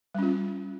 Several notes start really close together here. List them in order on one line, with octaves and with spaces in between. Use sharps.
G3 C#4 F4